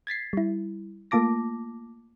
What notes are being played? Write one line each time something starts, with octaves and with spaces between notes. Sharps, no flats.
G#6 A6 B6 C7
G3 E4
A3 A#3 F4 A5 D6 A#6